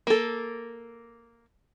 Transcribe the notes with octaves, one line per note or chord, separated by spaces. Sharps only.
A#3 A4